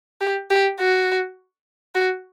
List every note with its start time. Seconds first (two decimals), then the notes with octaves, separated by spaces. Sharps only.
0.21 G4
0.50 G4
0.80 F#4
1.95 F#4